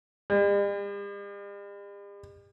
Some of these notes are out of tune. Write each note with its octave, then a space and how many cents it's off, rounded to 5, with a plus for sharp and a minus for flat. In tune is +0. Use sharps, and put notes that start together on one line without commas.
G3 +45